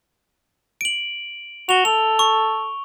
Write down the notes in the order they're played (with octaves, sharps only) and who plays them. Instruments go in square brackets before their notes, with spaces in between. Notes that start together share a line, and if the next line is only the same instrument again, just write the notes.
[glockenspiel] D7 F#7
[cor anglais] F#4 [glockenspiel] F7 G7
[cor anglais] A4 [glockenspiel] F7
[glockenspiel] C#6